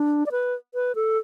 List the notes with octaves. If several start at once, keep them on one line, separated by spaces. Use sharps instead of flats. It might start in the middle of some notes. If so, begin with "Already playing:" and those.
Already playing: D4
D5
B4
B4
A4